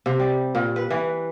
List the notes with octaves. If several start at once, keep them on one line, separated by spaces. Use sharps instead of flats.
C3
G3
A#2
B4
E3